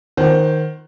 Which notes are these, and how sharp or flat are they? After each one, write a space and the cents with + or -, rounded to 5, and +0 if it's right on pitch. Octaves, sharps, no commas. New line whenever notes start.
D#3 +5 C5 +0 F#5 +30